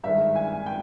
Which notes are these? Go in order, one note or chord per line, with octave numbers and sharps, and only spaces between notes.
G2 D#3 G#3 E5
G#5
G5